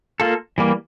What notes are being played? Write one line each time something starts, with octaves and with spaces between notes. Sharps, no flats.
A#3 F4 A4
E3 G3 A#3